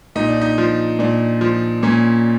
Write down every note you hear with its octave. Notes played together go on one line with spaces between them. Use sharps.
A#2 D#4
D4
D#4
F3
A#2 D4
F3
A#2 C#4